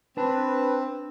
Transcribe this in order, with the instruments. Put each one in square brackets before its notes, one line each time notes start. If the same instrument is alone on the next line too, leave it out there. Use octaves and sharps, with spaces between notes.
[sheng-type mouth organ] C4 [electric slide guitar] D4 A5 [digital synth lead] B4